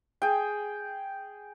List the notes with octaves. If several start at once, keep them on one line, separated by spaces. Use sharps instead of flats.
G#4 G5